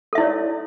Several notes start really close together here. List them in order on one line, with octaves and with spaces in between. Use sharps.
A4 E5 E4 D5 C#5